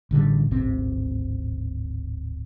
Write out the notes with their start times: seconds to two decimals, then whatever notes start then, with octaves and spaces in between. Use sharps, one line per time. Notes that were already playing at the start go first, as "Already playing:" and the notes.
0.11 A1 D3 F#3 G3
0.51 D1 G#1 C3 C4